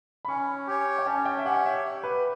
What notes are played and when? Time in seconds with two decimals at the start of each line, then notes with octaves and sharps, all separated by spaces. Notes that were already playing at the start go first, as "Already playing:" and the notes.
0.25 B5
0.28 C#4 C#6
0.67 G4 C#5
0.99 G5
1.06 C#4 A5
1.25 G5
1.38 E5
1.45 G4 C#5 F#5
1.65 E5
1.85 G4
2.03 B4